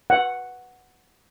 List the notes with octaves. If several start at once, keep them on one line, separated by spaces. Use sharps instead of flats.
F#5